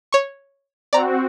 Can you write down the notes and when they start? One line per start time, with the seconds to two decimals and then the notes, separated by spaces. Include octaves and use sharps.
0.13 C#5 C#6
0.93 C4 F#4 D5 A#5